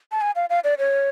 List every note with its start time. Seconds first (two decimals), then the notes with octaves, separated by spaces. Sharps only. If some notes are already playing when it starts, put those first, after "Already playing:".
0.12 A5
0.21 G#5
0.36 F5
0.50 F5
0.64 D5
0.78 C#5